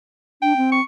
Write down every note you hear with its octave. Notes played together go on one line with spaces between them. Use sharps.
D4 G5
C4
C#6